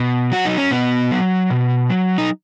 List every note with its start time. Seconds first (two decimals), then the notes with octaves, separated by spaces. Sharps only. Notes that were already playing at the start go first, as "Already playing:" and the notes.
Already playing: B2
0.32 F#3 F#4
0.45 D#4
0.58 C#4
0.71 B2 B3
1.11 F#3
1.50 B2
1.90 F#3
2.18 D#4